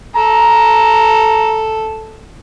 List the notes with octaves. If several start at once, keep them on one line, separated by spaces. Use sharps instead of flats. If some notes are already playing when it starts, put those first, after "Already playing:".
A4 A#5